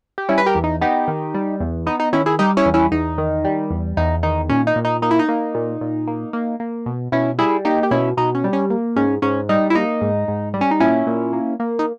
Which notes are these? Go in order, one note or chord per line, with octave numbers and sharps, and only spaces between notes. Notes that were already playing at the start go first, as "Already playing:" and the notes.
G4
G3 C#4 E4
B4
G4 A#4
E2
D#4
B3 D#4 G4
D#3
G3
E2
B3 D#4
D#4
D#3 C#4 E4
E4 G#4
G3 D#4 G4
C#4 E4
E2
C#4 E4
E2 D#4
D#3
G3
E2
E2 D#4
D#3 D#4
A#2 C#4
D#4
A#2
D#4
A#3 D#4
E4
D#4
A#3
A#2
A#2
A#3
A#3
A#3
B2
B2 C#4 E4
G3 E4 G#4
A#3 D#4 G4
G4
B2 C#4 E4
B2 D#4
C#4
G3
C#4
A#3
G#2 C#4
G#2 C#4
G3 D#4
E4
A#3 D#4
G#2
G#2
G3
C#4
D#4
A#2 C#4 E4
A#2
A#3
A#3
D#4